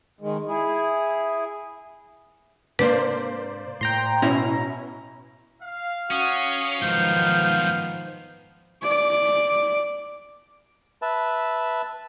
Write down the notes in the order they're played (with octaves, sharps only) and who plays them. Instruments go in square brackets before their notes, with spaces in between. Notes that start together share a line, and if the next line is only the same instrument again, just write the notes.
[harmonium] D#3 G#3
E4 G#4
[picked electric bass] G#2 C3 D4 [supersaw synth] A#3 C5 D5 [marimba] B4
[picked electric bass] A2 [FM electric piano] G5 A#5 C6
[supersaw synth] B2 C#4 E4 [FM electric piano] A#5
[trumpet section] F5
[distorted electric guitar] C#4 [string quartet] F#4 [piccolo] D#6
[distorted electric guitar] B1 G#2 [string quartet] D#3 F3 B3 [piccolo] G6
[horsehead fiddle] D5
[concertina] B4 E5 A5